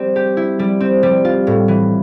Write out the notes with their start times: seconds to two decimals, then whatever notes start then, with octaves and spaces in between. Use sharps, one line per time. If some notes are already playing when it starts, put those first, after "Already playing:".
Already playing: G3 C4
0.16 G4
0.37 E4
0.59 G3
0.80 C4
1.03 G3
1.25 F4
1.47 A2
1.68 E3